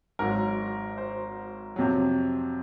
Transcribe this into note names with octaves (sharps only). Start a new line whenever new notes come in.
G#1 G#2 F#3 A#4
C5
F2 C3 F#3